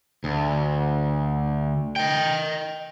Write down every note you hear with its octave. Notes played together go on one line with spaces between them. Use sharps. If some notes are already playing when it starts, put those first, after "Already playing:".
D2
D#5 G5